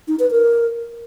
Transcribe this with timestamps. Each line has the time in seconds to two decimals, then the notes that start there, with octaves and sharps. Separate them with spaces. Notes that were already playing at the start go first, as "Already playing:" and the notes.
0.08 D#4
0.20 B4
0.31 A#4